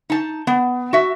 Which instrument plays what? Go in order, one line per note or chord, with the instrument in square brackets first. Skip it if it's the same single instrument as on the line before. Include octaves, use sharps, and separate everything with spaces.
[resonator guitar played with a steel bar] D#4 A5
B3
F#4 E5